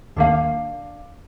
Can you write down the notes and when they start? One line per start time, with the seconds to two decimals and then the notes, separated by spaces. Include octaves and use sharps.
0.17 D#2 D#3 A#3 D4 F5